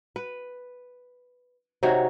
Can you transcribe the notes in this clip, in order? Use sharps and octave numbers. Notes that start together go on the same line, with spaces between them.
B4
C3 D#4 F#4 C#5